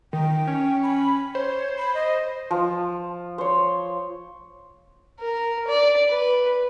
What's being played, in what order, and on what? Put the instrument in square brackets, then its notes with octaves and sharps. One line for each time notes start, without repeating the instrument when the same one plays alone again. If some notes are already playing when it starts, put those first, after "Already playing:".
[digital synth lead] D#3 [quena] G5
[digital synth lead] C#4
[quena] B5
[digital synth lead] C5 [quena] C#5
[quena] B5
D#5
[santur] F3
C5 C#5
[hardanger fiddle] A#4
D5
B4